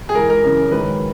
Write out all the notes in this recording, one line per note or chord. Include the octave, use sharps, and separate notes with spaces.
G#4
G#2 E3 A#4
A#4
F#2 C#3 E3
G#2 D#3 F#3 B4